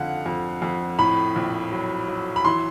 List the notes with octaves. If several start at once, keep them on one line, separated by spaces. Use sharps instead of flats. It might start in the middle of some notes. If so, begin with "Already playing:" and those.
Already playing: F2 D3 F5 F#5
F2
F2
A2 B5
A#1
F#3
F#3
B5
E3 C6